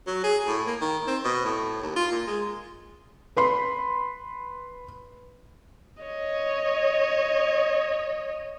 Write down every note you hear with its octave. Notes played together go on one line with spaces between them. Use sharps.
F#3
G#4
A2
A#3
D#3
C4
B2
A2
D#2
F4
A#2
G#3
B4 B5 C6
C#5 D#5